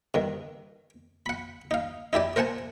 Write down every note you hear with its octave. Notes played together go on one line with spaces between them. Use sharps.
G2 D#3
F#5 B5
D#4 F5
D#4 E4 G4 D5
A#4 C5 F#5 G#5 A5